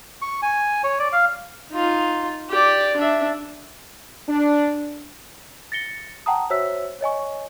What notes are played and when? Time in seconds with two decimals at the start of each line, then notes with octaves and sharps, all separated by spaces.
0.22 C#6
0.42 G#5
0.84 C#5
0.99 D5
1.12 F5
1.71 D#4 F4
2.49 G4 D5
2.96 D4 E5
4.28 D4
5.72 A6 A#6 C#7 G7
6.26 F#5 G5 A5 A#5 D#6
6.50 F#4 C5 C#5 E5 E6 B6
7.01 C#5 D#5 G#5 C#6